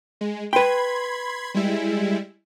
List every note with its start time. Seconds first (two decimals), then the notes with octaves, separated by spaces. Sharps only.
0.21 G#3
0.53 B4 G5 B5 C6 G#6
1.54 G3 G#3 E4